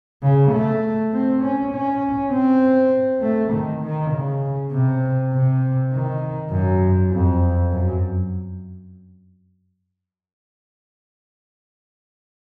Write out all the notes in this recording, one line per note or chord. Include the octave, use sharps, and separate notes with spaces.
C#3
A3
C4
C#4
C#4
C4
A3
D#3
D#3
C#3
C3
C3
D#3
F#2
F2
F#2